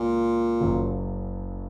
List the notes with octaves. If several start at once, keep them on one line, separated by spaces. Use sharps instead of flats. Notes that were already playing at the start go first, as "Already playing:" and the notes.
Already playing: C#2 A#2
F#1 F#2 C#3 F#3